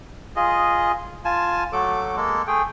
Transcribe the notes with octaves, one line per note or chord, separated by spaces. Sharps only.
F4 G#4 D#5
F4 G#5 A5
F#3 A3 A4 D6
G#3 A#3 A4
A3 G#4 G5